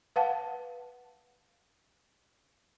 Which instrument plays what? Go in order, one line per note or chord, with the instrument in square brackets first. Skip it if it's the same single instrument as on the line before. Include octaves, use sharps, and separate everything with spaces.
[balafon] B4 F5 F#5 A5